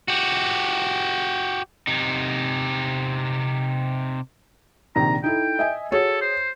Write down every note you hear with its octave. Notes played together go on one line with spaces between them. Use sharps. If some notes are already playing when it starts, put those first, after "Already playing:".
F#4 G4
C3 D#4
A#1 C3 D#3 A#5
D#4 E4 A4 G5
D#5 E5 G#5
F#4 G#4 A4 C#5
C5